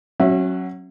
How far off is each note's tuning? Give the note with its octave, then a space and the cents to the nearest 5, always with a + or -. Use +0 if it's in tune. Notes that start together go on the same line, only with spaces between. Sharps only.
F#3 +0 C#4 -25 E5 +0